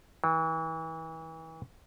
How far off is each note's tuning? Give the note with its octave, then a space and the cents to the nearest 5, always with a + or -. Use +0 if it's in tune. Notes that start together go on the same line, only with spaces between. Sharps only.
E3 -35